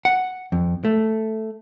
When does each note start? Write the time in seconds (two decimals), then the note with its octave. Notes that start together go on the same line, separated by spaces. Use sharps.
0.05 F#5
0.52 F2
0.85 A3